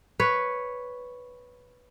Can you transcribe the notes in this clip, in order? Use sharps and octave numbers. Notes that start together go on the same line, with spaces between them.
B4 C#5